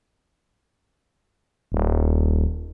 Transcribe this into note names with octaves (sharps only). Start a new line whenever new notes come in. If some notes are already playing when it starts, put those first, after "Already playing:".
D#1